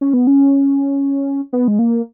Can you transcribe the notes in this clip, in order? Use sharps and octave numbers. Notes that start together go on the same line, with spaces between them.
C#4
B3
C#4
B3
G#3
A#3